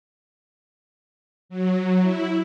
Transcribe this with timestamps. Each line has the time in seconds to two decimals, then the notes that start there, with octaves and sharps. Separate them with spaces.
1.49 F#3
2.00 E4